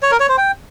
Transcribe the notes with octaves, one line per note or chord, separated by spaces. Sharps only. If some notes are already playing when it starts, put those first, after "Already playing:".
C#5
A#4
C#5
C5
G5